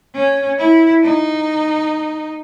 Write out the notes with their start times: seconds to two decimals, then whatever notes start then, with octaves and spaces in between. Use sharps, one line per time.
0.15 C#4
0.59 E4
1.03 D#4